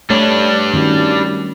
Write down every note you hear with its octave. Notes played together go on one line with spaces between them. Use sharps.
G3 A3 D4 C#5
D#3 C#4 F#4